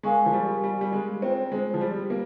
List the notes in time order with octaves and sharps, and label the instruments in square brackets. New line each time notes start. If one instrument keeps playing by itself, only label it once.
[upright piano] G#3 [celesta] A#4 F5 G#5 C#6
[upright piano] F3
G3
G3
G3
G#3
[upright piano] C4 [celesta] F4 C5 G5
[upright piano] G#3
F3
G3
A#3